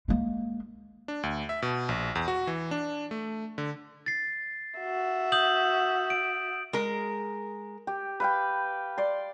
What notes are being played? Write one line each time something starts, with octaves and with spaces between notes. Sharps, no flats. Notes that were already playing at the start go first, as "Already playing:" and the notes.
G#3 A#3
D4
D2
E5
B2
A#1
E2
F#4
E3
D4
A3
D3
A6 C7
F#4 E5
D#6 G6 F#7
D7
G#3 A#4
G4
B4 F5 G5
D5 C6